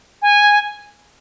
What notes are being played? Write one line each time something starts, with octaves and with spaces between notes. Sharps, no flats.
G#5